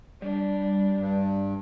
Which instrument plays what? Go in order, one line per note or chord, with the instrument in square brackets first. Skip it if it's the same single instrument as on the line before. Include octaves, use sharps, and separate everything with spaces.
[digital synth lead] G3 [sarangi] D4
[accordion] G2